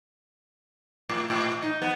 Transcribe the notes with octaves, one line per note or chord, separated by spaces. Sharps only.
A2
A2
D#4
B3